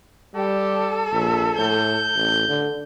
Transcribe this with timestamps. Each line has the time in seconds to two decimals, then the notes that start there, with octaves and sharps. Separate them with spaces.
0.35 G3 G4 A4
1.13 A#1 E5
1.58 A2 G6
2.15 A1
2.49 D3